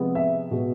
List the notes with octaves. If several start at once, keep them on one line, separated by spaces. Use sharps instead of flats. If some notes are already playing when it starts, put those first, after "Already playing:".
Already playing: C3 F3 G#3 B3
E5
B2 G#3 B3